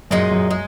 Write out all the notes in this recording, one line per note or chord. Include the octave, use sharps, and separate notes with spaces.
F#2 A#2 G#3 D#4
F#2
G#3